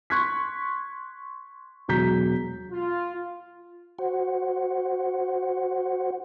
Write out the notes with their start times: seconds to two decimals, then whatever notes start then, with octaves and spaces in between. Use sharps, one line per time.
0.10 C6 C#6 F#6 G#6 B6
1.88 E1 F#3 A#5 G6 B6
2.72 F4
3.99 F#4 C5 F#5